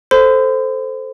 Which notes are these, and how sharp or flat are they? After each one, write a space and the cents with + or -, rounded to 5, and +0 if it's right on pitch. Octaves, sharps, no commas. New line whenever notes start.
A4 +0 C5 +0 C6 -45